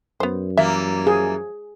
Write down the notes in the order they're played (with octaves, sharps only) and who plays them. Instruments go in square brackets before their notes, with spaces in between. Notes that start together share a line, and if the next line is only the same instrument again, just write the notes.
[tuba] F#2 [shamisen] B3 C5
[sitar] E3 G3 A#3 [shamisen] E5
[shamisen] F3 [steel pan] G#4